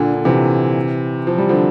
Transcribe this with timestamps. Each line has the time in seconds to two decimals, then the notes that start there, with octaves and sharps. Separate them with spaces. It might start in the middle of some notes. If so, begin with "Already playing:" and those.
Already playing: A#2 D3
0.13 D3
0.25 C3 E3
1.27 F3
1.38 G3
1.49 D3 F3